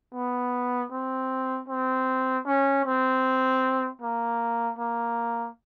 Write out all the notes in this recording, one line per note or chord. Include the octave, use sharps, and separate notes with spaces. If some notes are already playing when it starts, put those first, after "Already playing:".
B3
C4
C4
C#4
C4
A#3
A#3